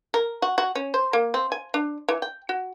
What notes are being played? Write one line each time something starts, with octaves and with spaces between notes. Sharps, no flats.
A#4
F#4
F#4
C#4
C5
A#3
C4
G#5
D4
E3
G5
F#4